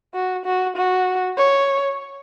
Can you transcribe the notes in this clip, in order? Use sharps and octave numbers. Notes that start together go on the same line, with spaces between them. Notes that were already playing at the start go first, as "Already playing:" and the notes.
F#4
F#4
F#4
C#5